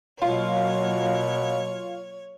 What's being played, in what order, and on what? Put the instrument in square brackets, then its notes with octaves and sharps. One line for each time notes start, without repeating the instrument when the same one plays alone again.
[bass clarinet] B2 [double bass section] F#3 A#3 [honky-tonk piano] F4 [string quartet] C#5